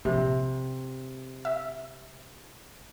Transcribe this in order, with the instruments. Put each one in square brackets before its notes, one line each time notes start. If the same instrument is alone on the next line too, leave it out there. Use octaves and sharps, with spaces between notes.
[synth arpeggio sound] A#1 [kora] C3
[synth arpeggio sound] E5